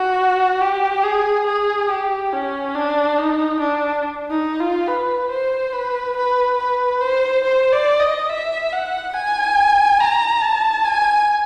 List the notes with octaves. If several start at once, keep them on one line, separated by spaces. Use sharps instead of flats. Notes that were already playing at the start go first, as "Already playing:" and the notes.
Already playing: F#4
G4
G#4
G#4
G4
C#4
D4
D#4
D4
D#4
F4
B4
C5
B4
B4
B4
C5
C5
D5
D#5
E5
F#5
G#5
A#5
A5
G#5